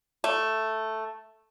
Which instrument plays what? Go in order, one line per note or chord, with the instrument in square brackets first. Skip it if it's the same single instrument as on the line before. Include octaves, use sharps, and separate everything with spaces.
[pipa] A3